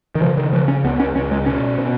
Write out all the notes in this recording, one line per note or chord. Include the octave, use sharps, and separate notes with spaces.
D#3
C#3 F3
D#3
C#3 F3
C#4
C#2 B3
C#4
C#2 C#4
G#3
B2 C#4
B2